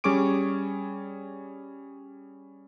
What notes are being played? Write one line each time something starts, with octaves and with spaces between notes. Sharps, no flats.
G3 C#4 G#4 C#6 D6 D7